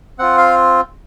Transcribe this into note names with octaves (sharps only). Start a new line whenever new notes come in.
C4 F4 F#5
F5